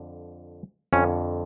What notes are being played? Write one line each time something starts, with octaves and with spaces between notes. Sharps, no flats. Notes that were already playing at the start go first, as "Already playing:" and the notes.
Already playing: F2 D3
F2 D3 C#4